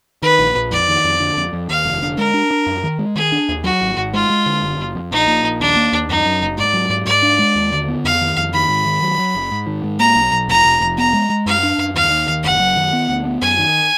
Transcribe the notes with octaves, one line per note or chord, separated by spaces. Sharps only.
D#3 B4
A#1
A#1
F2 D5
D#3
F2
D3
F2
F2
D#2 F5
F1
D3
G#3 A#4
D4
D4
F#2
D#3
G#3
D#3 G#4
D4
D#2
F#3 F#4
G#1
G#1
G#3 F4
G#3
D3
F#1
F#1
F2
A#1 D#4
A#2
A#1
D#2 D4
A#3
D#2
F#2 D#4
F#2
F#1
G#2 D5
F#3
G#2
G#2 D5
D4
G#3
D#2
D3
B3
F2 F5
D#3
F2
D#3 B5
G#2
D#3
F#3
F#3
F#1
G#2
D#3
G#2
A#3 A#5
B1
B1
F1 A#5
F1
F1
B3 A#5
G#3
G#3
F#2 F5
D4
F#2
D#2 F5
D#3
D#2
F#1 F#5
F#2
D#3
B3
D2
B3
F#2 G#5
D#3